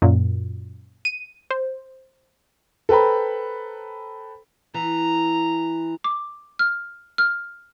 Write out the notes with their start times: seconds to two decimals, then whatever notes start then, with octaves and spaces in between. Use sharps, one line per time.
0.02 F#2 A#2
1.05 D#7
1.51 C5
2.89 A4 B4 C5 G5 A#5 B5
4.74 E3 A#5
6.04 D6
6.59 F6
7.18 F6